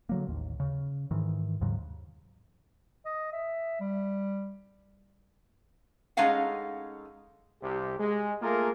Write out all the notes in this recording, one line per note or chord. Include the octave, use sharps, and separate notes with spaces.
D3 F#3 A#3
A1 D#2
C#3
G#2 D#3 E3
D#2 G#2 C#3 F#3
D#5
E5
G3
G#3 A3 C#4 D#4 F5 F#5
C2 C3 G4
G#3
A3 A#3 F4 G#4 A#4